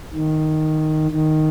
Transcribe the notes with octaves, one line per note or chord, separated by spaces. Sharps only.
D#3
D#3